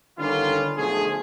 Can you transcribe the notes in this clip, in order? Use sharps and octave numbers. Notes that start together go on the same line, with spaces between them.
D3 D#3 G3 B3 C#4 F4
B1 D3 F3 A3 G#4